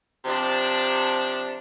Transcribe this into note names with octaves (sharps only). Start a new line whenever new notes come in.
C3 F3 D4